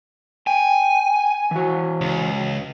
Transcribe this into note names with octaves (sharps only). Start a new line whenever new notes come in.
G5 G#5
E3 F#4
C#2